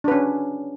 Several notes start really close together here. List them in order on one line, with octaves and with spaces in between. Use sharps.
D4 B4 C#4